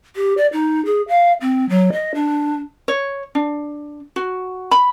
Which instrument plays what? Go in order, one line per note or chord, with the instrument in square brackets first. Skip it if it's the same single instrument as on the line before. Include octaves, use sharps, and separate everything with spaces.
[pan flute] G4
D5
D#4
G#4
F5
C4
F#3
D#5
D4
[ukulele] C#5
D4
F#4
B5